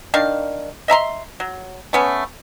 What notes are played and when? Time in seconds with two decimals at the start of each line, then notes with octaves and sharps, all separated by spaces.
0.14 D#3 D4 F5
0.88 D#5 E5 A#5 C6
1.40 F#3
1.93 A3 B3 C#4